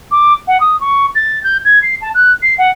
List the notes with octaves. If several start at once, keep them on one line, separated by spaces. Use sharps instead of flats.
D6
F#5
D#6
C#6
A6
G6
G#6
C7
A5
F#6
C7
F#5